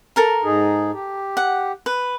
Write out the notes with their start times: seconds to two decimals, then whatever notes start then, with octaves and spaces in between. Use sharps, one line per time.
0.16 A4 A#4 A#5
0.44 G#2 D#4 G#4
0.93 G4
1.37 F#5
1.86 B4